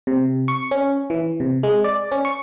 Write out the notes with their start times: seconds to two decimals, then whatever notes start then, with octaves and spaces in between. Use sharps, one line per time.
0.07 C3
0.48 C#6
0.71 C#4
1.10 E3
1.40 C3
1.63 G#3
1.84 D5
2.12 C#4
2.25 C#6